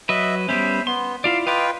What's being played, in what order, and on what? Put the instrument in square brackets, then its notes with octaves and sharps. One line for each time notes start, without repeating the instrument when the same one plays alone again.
[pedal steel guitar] F#3 B4 [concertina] D#5 E5
[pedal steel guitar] G3 B3 C#4 [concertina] C5 E5 B5
[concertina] B3 [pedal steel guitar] C6
[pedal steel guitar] E4 F4 D5 [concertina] F5
[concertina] F4 B4 G5 [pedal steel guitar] D#5 F5 D6